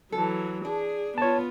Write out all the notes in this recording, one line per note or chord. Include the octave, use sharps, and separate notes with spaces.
E3 F#3 A4
D4 G#4
B3 F4 C#5 A5